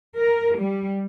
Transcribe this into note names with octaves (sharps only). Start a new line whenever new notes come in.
A#4
G3